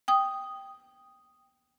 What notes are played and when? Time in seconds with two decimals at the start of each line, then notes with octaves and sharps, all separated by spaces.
0.08 G5 D#6